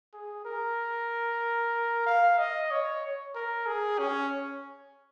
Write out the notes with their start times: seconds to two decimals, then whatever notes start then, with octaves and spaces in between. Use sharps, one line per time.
0.14 G#4
0.45 A#4
2.06 F5
2.38 D#5
2.71 C#5
3.35 A#4
3.67 G#4
3.99 C#4